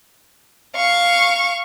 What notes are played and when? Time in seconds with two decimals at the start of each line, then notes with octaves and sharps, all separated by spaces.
0.76 F5 C#6